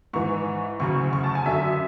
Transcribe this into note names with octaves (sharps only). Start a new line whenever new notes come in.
G#2 E3 C#6
D2 C#3 F#3 C#6
C#6
A5
G#5
F#2 D3 F#3 E5